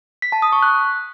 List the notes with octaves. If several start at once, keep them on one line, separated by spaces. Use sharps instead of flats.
B6
A5
D#6
C#6
F#6